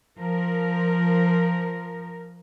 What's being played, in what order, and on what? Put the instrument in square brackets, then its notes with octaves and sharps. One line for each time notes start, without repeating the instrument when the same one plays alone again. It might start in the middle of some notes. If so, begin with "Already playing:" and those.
[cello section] F3 A#4